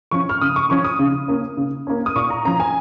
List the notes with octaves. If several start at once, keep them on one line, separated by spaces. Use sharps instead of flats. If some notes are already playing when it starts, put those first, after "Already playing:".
F3 C#4 C#6
F6
C#3 D#6
C#6
F3 C#4 C#6
D#6
C#3
A#3 C#4
C#3
A#3 C#4
D#6
A#2 C#6
A#5
F3 C#4 A#5
G#5